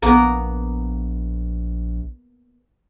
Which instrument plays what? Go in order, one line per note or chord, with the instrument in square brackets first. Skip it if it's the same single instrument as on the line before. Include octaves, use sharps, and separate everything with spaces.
[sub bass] A#1 [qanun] A#3 B3 A#5